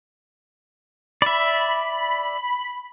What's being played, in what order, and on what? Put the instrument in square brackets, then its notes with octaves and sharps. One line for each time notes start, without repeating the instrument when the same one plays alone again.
[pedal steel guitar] D5 E5 [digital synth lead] B5